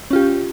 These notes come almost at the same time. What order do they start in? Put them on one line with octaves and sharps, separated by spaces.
C#4 F4 G4